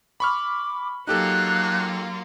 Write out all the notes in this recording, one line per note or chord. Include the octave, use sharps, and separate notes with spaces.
B5 C#6 D6 F6
F#3 A#3 D#4 F4 G4 A4 F#6